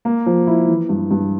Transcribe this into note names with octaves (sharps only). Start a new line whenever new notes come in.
A#3
F3
E4
E3
G2
G2